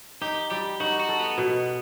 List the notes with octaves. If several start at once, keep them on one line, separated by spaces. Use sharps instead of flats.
D#4 G4
G3 G4
D#4 F#4
F#4
A4
B3
B2